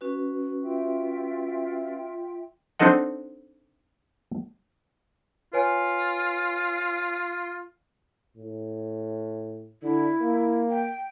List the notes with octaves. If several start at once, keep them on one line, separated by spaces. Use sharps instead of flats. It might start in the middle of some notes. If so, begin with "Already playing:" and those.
C#4 F#4 B4
F4 E5 G5
C4 D4 D#4 A4 D#5 F#5
F4 B4 C#5 G#5
A2
D3 E4
A#3
G5